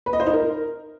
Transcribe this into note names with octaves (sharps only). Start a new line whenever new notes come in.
B4
D#5
C5
D#4
A#4